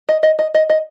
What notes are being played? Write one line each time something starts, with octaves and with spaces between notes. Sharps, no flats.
D#5
D#5
D#5
D#5
D#5